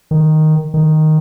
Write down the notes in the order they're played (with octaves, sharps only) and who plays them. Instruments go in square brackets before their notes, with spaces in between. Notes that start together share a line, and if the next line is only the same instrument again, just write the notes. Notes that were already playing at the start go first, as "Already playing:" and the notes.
[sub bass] D#3
D#3